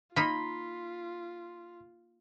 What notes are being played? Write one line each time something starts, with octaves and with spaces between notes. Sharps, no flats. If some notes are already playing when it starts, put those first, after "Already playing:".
A#3 D#4 F4 F5 B5 C6 B6